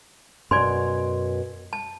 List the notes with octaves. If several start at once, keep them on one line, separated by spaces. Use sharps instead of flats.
F#2 B2 D5 G#5 C6
A5